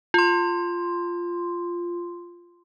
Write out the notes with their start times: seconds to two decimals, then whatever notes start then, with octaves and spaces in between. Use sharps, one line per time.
0.14 F4 C6